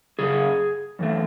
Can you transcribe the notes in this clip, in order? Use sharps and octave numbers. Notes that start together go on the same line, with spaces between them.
F#2 C#3 G#4
F#2 E3 A3